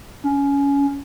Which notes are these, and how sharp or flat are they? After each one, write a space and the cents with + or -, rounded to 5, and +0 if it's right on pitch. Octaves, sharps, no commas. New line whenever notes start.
C#4 +20